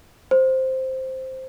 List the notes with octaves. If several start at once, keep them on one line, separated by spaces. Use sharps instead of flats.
C5